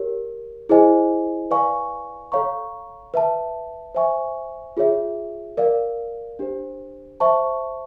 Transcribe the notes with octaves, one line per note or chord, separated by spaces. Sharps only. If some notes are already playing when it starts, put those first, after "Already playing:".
Already playing: G4 A#4 C#5
E4 G#4 C5 D#5 G#5
B4 D5 F5 G#5 C#6
A4 C#5 F5 A#5 C#6
B4 E5 A5
C5 E5 G#5 C#6
F4 G#4 C#5 E5
A#4 D5 F5
D4 G4 C5
C5 E5 A5 C#6